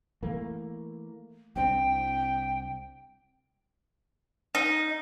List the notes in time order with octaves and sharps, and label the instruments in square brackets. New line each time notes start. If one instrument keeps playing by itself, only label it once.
[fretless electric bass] E3 A3 A#3
[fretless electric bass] C2 C4 D4 [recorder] G5
[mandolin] D#4